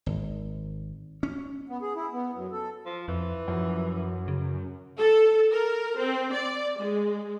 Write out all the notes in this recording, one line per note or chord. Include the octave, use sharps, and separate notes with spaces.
G#1
C#4
B3
G#4
E4
B3
F#2
A4
F3
F2 E3
F#2 F3
C#3
A4
A#4
C4
D5
G#3